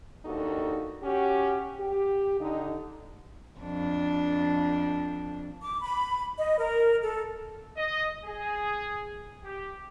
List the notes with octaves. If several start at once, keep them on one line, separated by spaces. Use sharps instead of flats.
D#2 D4 D#4 F#4 A4
C#4 F#4 G4
G4
D3 D#4
F2 D4
D6
B5
D#5
A#4
A4
D#5
G#4
G4